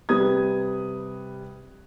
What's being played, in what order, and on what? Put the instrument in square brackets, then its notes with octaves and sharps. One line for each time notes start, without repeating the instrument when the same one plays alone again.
[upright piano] C3 G3 B4 D#6 G#6